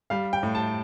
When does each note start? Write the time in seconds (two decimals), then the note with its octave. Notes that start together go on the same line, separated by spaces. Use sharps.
0.10 G3 F5
0.33 G5
0.43 A2
0.55 A5